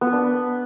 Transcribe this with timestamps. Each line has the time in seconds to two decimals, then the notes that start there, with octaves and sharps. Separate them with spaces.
0.01 B3
0.07 B4
0.13 D4